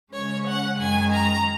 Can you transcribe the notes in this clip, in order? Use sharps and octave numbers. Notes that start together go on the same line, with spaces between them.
C#3 G#3 C#4 C#5
F#5
F#2 D#3 G#3 G#5
A#5